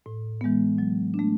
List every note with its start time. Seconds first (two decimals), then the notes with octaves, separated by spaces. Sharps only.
0.06 A2
0.41 E3 G#3 B3
0.78 F#3
1.14 D4
1.19 A3